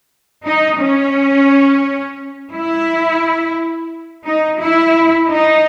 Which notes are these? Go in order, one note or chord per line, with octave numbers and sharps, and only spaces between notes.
D#4
C#4
E4
D#4
E4
D#4